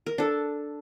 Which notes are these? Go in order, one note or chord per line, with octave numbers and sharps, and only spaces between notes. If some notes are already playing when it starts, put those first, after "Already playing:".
A#4
D4 A4